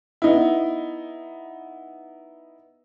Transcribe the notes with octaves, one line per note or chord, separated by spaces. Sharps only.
B3 D#4 E4